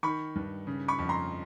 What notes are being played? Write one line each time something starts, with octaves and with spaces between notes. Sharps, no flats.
D#3 B5 C#6
G2
C#3
B5 C#6
F2
A#5 C6